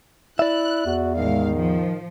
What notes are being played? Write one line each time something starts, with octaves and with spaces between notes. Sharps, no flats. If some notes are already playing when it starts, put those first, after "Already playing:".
E4 D5 E5 F#6
E2 F#4
A1 D#3 G#3 F5
F3